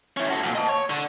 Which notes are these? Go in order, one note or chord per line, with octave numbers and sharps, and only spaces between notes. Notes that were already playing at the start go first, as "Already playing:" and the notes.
C#4 E4
F#4 A4
D#2 A#2
D#5 A5
C#5
D3